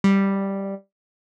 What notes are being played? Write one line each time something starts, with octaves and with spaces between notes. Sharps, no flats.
G3